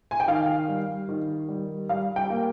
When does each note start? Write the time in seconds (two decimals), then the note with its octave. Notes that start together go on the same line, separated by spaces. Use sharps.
0.11 G#5
0.20 G5
0.28 D#3 F5
0.68 G3
1.09 D#3
1.49 G3
1.89 G3 F5
2.16 G5
2.30 A#3